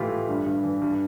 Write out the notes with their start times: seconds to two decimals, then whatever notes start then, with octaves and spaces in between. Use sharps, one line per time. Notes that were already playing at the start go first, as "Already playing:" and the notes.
Already playing: A2 E3 E4 F4 G4
0.10 A2
0.28 G2
0.46 G2
0.63 E3
0.82 G2